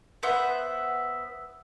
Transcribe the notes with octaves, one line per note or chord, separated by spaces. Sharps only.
B3 C5 E5 F#5